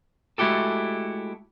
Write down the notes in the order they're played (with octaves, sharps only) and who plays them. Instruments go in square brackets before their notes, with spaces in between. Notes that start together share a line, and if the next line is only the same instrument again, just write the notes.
[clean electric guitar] G#3 A3 E4 F#4 G4 A4